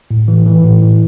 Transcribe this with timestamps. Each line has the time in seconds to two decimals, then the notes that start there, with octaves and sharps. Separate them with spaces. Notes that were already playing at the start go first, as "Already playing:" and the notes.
0.11 A2
0.28 E3
0.46 E3
0.64 A2
0.82 E3